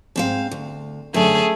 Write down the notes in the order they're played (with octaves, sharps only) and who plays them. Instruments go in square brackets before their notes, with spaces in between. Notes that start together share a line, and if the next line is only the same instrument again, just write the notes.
[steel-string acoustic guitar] G#2 C4 F5
D2
[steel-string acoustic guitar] F#2 D3 [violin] A3 G#4